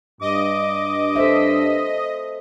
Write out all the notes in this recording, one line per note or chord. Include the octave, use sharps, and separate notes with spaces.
G2 D#5 D6
A4 C5 E5